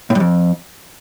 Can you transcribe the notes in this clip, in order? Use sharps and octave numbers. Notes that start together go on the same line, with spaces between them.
A2
G2
F2